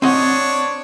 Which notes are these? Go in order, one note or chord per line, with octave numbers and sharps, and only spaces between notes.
C4 D4 C#5 D#5 F#5